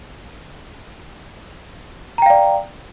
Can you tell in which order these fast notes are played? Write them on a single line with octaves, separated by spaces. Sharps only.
A#5 G5 F5 D5